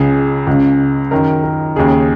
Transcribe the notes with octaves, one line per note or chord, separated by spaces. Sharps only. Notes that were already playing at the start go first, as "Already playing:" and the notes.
Already playing: C#2 C#3 G#4
C#2 C#3
F#2 D#3 A#4
A#4
D#2 C#3 G#4